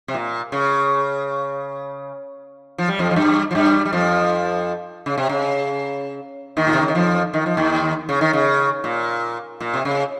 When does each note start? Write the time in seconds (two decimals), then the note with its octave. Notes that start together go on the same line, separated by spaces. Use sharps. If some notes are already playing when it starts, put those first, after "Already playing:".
0.08 C3
0.14 A#2
0.52 C#3
2.78 F3
2.88 G3
2.99 F2 F3
3.11 F3
3.16 G2 G3
3.51 F3
3.55 G2 G3
3.85 G3
3.92 F2 F3
5.06 C#3
5.18 C3
5.29 C#3
6.57 D#2 D#3
6.67 A#2
6.73 C3
6.81 C#3
6.88 D#3
6.95 F2 F3
7.34 D#3
7.46 F3
7.57 D#2 D#3
8.09 C#3
8.21 D#3
8.33 C#3
8.84 A#2
9.60 A#2
9.74 C3
9.85 C#3